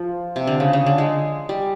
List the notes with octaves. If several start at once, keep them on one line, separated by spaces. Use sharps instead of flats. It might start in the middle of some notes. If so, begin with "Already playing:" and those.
Already playing: F3
C3
D3
C#3
C#3
D3
G#3
G3